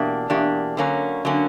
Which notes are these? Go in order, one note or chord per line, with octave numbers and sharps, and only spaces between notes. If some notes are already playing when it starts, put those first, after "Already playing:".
Already playing: E2 B2 A#3 D4 G4
E2 B2 A#3 D4 G4
D3 F#3 A#3 C#4
D3 F#3 A#3 C#4